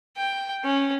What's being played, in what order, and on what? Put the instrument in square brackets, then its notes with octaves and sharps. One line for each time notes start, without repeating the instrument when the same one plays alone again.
[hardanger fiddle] G5
C#4